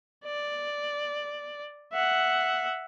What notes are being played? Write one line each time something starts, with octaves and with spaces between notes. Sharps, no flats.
D5
E5 F#5